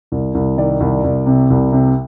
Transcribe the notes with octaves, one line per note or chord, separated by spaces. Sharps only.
C2
C2
D#3 D5
C2
C2
C3
C2
C3